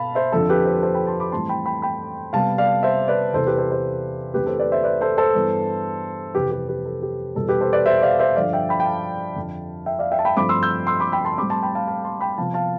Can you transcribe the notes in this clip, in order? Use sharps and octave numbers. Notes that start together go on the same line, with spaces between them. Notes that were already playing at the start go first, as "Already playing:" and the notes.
Already playing: B2 B3 F5 A5 B5
C5 E5
F2 D3 F3 C4 A4
G4 B4
A4 C5
B4
A4 C5
G5 B5
A5 C6
B5 D6
A2 E3 G3 C4 A5 C6
G5 B5
G5 B5
G5 B5
C3 G3 B3 F5 A5
D5 F5
C5 E5
B4 D5
E2 C3 E3 A4 C5
G4 B4
A4 C5
A4 C5
E2 D3 A3 C4 G4 B4
A4 C5
B4 D5
C5 E5
B4 D5
A4 C5
A4 C5
G2 E3 B3
F2 C3 E3 G4 B4
G4 B4
G4 B4
A4
G4
E2 B2 G3 B3 A4
G4 B4
A4 C5
B4 D5
C5 E5
D5 F5
C5 E5
G2 D3 F3 D5 F5
E5 G5
G5 B5
G5
F5 A5
F2 D3 F3
E5 G5
D5 F5
E5 G5
A5
G5 B5
G2 D3 F3 A3 C4 B5 D6
C6 E6
E6 G6
C6 E6
B5 D6
G5 B5
A5 C6
A2 G3 C4 B5 D6
A5 C6
G5 B5
F5 A5
F5 A5
A5 C6
G5 B5
C3 F3 B3 F5 A5
F5 A5